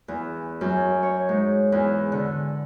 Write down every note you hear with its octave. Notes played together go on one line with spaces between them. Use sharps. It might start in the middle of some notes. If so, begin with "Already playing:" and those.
E2
F#2
C#5
G#2
E2
D3